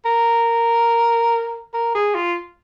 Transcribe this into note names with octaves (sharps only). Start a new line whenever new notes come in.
A#4
A#4
G#4
F4